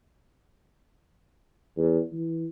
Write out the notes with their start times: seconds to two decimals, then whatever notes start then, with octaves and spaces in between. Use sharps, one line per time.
1.77 E2
2.12 E3